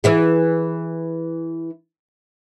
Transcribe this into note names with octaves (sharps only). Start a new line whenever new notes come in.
E3 E4 G#4